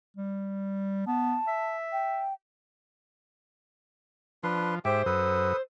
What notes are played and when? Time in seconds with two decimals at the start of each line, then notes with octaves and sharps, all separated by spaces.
0.17 G3
1.07 B3 A5
1.47 E5
1.92 G5
4.44 F3 D4 B4 C6
4.85 G#2 G4 C5 E5 G5
5.06 F#2 A4 B4 D#6